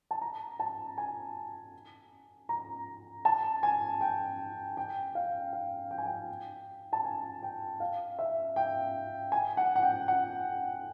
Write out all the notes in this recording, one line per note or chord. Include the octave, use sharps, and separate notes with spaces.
A5
A#5
A5
G#5
A#5
A5
G#5
G5
G5
F5
F5
G5
G#5
G5
A5
G#5
G5
F5
E5
G5
G#5
F#5
F#5
G5
F#5